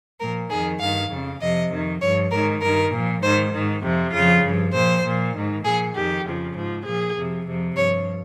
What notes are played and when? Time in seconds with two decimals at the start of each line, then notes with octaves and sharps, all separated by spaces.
0.20 A#2 F3 A#4
0.50 F2 D#3 G#4
0.80 G2 D#3 F5
1.10 F2 C#3 F3
1.40 F2 C3 F3 D#5
1.71 F2 D#3
2.01 G2 F3 C#5
2.31 G#2 D#3 A#4
2.62 G2 D#3 A#4
2.92 A#2 F3
3.22 G#2 D#3 C5
3.52 G#2 D#3
3.82 F2 C3 F3
4.13 F2 C#3 F3 F4
4.43 G2 F3
4.73 A#2 F3 C5
5.04 A#2 F3
5.34 G#2 D#3
5.64 A#2 F3 G#4
5.94 F2 D#3 G4
6.24 F2 C#3 F3
6.55 G#2 F3
6.85 A#2 F3 G#4
7.15 F2 C3 F3
7.46 F2 C3 F3
7.76 G2 F3 C#5